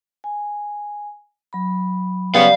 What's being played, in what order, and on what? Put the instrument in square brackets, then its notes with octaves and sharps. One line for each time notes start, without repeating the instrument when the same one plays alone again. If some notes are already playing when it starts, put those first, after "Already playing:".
[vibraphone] G#5
F#3 B5
[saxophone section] C#3 B3 [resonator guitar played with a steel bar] G3 [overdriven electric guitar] F5